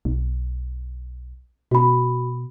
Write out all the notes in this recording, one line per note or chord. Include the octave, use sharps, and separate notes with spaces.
B1
B2 F#4 B5